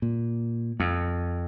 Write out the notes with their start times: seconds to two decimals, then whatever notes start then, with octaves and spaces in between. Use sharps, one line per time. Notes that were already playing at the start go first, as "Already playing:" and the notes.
0.02 A#2
0.80 F2